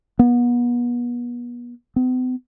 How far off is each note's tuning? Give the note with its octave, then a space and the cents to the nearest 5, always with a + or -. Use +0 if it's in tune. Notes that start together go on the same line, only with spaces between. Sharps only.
B3 -35
B3 +45